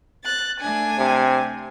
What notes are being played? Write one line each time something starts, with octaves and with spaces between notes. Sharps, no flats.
F#6 A6
A3 D4 G#5
C3